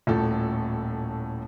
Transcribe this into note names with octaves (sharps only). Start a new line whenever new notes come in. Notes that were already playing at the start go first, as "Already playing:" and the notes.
D#1 A2 A4